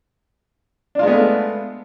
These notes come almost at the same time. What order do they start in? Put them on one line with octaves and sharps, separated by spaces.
D4 F4 G#3 B3 A3